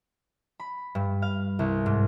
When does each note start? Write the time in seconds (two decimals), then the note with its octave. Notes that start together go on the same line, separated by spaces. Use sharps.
0.60 B5
0.95 G2
1.22 F5
1.59 C2
1.86 G#2